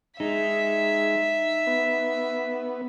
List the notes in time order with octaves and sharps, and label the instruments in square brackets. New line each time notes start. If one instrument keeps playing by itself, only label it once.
[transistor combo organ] G#3 [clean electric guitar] D#4 [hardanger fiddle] E5
[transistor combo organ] B3